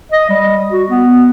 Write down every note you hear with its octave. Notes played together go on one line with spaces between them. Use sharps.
D#5
G3
F#4
B3